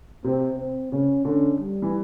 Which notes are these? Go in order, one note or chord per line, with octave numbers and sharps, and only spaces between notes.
C3 C4
C4
C#3 C#4
D3 C#4
G3
E3